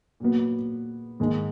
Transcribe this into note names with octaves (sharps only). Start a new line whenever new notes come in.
A#2 F#3 B3
G#2 D#3 G#3